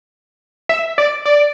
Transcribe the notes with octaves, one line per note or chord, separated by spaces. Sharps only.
E5
D5
D5